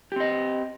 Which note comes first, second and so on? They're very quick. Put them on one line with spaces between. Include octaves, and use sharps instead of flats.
G4 C4 D#5